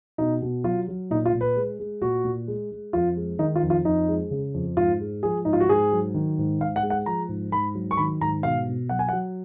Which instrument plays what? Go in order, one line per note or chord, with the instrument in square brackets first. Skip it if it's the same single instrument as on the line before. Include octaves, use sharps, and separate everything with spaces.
[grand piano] B2 D#4
B2
F#3 F4
F#3
A#2 D#4
F4
A#2
B4
G#3
G#3
A#2 F#4
A#2
G#3
G#3
F2 F4
G#3
D#3 D#4
F4
F2
F4
F2 D#4
G#3
C#3
F2
G#2 F4
G#3
F3 G#4
G#2 D#4
F4
F#4
G#2 G#4
F#3
D#3
G#2
G#2 F5
F#5
G#3
F#5
F3 A#5
G#2
G#2 B5
F#3
C#6
D#3 B5
G#2 A#5
B2 F5
B2
F#3 F#5
G#5
F#5
F#3